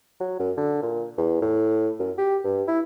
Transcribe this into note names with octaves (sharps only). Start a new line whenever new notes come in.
F#3
F#2
D3
A#2
E2
A2
F#2
G4
G2
E4